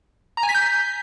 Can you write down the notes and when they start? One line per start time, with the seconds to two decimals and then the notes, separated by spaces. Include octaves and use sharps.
0.37 A#5
0.43 G#5
0.49 B6
0.55 G6